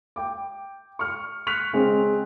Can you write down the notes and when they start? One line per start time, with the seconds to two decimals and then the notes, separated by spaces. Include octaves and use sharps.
0.16 G5 D6
0.99 C#6 F6
1.47 C#6 F6 F#6 B6 F7
1.73 C#3 G#3 C4 C#4